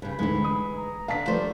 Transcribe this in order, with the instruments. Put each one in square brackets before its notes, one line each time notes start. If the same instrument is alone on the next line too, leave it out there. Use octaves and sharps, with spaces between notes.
[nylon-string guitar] G2 C#3 [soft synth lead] B5
[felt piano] D2 G#2 D3 [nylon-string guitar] E3 G#3
[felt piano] D#6
[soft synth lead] A#5
[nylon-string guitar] D3 B3 [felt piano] F5 A5 B6
[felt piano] F3 G3 [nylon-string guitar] A3 B4 C5 [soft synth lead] D5